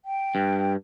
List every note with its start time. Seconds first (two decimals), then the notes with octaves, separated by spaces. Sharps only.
0.05 G5
0.35 G2